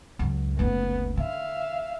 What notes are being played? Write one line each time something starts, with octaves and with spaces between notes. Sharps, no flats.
C#2 F#2
F#1 D2 B3
D3 E5 F5